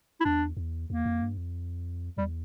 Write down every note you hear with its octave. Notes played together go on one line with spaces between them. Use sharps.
E4
E2 D4
E2
E2 A#3
F2
G2
F2
E2 G3